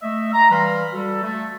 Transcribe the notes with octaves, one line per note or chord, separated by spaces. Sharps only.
A3 D#5 E5
A#5
E3 G3 F5 B5 C6
G3 F#4 A4
A3